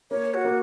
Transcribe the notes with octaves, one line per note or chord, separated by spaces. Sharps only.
A#3 C#5
F#4
A#3